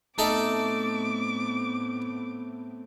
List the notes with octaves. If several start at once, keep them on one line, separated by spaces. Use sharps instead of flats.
A2 A3 B3 C4 D#4 A4 D5 D6